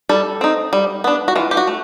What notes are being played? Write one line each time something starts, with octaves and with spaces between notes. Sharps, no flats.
G3 A4
C4 D#4
G3
B3 D4
F#4
E3 F4
G4
F#4
A3